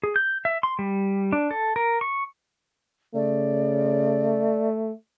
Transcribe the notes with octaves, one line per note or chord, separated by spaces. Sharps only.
G#4
G6
E5
C6
G3
D4
A4
A#4
C#6
C#3 A3 D5